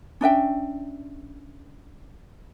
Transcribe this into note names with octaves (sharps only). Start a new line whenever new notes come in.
C#4 D4 E5 G5